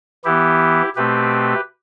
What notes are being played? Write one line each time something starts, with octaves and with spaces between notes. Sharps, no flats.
E3 B3 E4 G4
B2 A3 C4 G4 B4